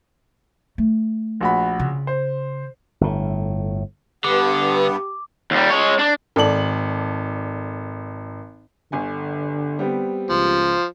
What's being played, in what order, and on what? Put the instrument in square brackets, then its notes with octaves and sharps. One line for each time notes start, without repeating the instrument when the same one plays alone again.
[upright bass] A3
[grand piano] A#1 F#4 B5
[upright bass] C#3
[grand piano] C5
[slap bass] G1 A2
[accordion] G2 B3 [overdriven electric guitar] D3 [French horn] G4 [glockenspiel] D6
[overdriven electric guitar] D#2 G3
G#3 C#5
D4
[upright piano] G#1 A4 D5 F#7
[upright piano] G1 G#5 [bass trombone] D3
[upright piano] G3 B3 C4
[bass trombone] C#2 [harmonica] F3